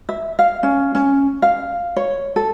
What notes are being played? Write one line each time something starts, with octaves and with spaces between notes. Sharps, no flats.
E5
F5
C#4
C#4
F5
C#5
A4